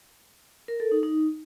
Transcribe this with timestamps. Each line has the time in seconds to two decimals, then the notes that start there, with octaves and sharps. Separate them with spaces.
0.68 A#4
0.80 A4
0.91 D#4
1.03 D#4